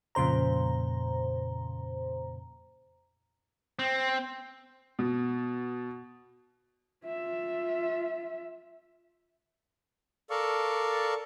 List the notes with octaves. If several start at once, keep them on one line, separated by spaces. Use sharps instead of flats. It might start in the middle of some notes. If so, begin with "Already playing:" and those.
F2 A#2 C#3 C5 A#5
C4
B2
F4 E5
A4 A#4 D5 F5 C#6